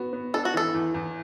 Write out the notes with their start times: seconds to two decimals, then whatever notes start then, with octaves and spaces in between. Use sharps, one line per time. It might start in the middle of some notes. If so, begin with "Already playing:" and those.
Already playing: B3 F#4
0.13 B3
0.34 D4 A4
0.45 F#4
0.54 E3 A4
0.74 E2
0.94 E2